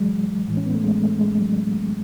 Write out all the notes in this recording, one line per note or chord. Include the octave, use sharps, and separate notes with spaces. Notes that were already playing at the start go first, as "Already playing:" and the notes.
Already playing: A2 E3 F#3 G#3
A2 E3
C#4
B3
A3
G#3
G#3
A3
G#3
F#3